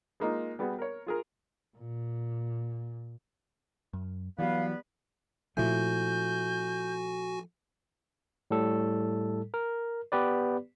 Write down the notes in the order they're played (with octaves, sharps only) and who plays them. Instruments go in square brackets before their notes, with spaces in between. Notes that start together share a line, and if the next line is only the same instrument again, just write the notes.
[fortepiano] G#3 A#3 D#4 F4
G3 B3 F#4 G#4
A#4 C#5
F4 G#4 A#4
[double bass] A#2
[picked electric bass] F#2
[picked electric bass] E3 F#3 [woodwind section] G3 B3 B4 [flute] F5
[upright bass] A#2 C4 [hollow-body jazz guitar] F3 A3 E4 [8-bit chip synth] F#4 G#5 [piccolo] G6
[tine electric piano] A2 G3 A4
A#4
B3 G4 B4 D5